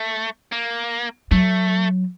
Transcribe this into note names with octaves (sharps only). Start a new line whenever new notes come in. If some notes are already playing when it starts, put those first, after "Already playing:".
Already playing: A3
A#3
F#3 A3